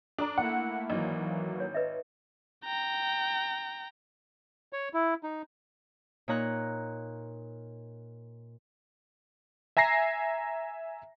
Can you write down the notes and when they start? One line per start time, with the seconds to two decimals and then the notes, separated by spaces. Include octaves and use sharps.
0.18 D4 A4 A#5
0.38 A3 A#3 E4 F#5
0.90 G#1 E3 F#3 A#3 D#5
1.60 C#5
1.74 B4 D#5 E5
2.65 G5 A#5
4.73 C#5
4.94 E4
5.23 D#4
6.28 A#2 D#4 C#5 A#5 F#6
9.77 E5 G#5 A#5 A#6 C7